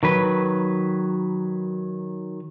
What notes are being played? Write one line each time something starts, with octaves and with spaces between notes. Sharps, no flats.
D#3 F#3 B4